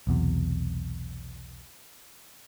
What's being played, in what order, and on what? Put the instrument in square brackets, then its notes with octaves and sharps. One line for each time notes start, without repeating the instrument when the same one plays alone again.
[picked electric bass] B1 E2 C3